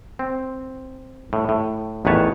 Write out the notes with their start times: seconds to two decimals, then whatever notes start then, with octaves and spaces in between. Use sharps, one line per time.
0.19 C4
1.33 A2
1.49 A2
2.05 A1 E2 D#3 B4 C#5 A5